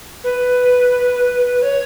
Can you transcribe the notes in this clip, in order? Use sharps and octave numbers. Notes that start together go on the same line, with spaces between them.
B4
C#5